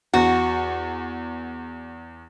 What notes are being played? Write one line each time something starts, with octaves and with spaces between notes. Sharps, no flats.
E2 F#4